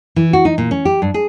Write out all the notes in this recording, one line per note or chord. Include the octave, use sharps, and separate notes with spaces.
E3
F#4
D#4
A#2
C#4
G4
G2
G#4